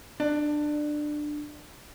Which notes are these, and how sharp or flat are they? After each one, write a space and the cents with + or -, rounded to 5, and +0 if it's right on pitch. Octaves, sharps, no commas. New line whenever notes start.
D4 +20